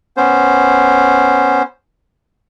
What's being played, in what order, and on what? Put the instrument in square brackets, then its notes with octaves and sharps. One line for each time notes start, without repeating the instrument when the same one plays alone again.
[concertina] B3 C#4 C5